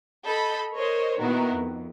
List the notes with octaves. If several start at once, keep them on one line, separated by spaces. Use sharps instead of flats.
A4 D#5 B5 G6
A#4 C5 C#5 D#5
A#2 D#3 B3 E4 F#4 A#4
F2